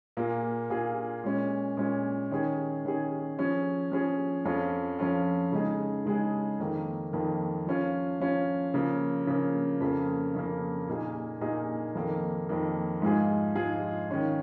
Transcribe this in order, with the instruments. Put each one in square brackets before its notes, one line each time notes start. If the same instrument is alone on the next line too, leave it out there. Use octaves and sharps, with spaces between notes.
[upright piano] A#2 A#3 F4 G#4
A#2 A#3 F4 G#4
A#2 G#3 C#4
A#2 G#3 C#4
D#3 C#4 G#4
D#3 C#4 G#4
F3 C#4 G#4
F3 C#4 G#4
F2 F3 C#4 F4
F2 F3 C#4 F4
C#3 G#3 D#4 G#4
C#3 G#3 D#4 G#4
F2 D#3 A#3
F2 D#3 A#3
F3 C#4 F4
F3 C#4 F4
C#3 F3 A#3
C#3 F3 A#3
F2 C#3 A#3
F2 C#3 A#3
A#2 A#3 D#4 G#4
A#2 A#3 D#4 G#4
F2 D#3 A#3
F2 D#3 A#3
G#2 F3 G#3 F4 G#4
G#2 F3 G#3 F4 G#4
D#3 C#4 F4